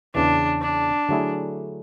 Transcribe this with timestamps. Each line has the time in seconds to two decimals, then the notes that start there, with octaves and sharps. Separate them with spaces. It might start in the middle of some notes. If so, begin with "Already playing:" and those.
0.14 E2 C#3 E3 D4
0.62 D4
1.09 D3 F#3 A3 E4 G#4